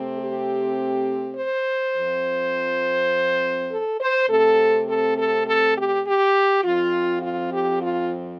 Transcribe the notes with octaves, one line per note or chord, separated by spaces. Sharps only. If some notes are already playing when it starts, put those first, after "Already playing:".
Already playing: C3 A3 C4
G4
C5
F2 F3 C4
A4
C5
C3 A3 C4 A4
A4
A4
A4
G4
G4
F2 F3 C4 F4
F4
G4
F4